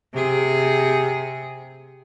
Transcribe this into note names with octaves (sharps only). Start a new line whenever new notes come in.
C3 G#4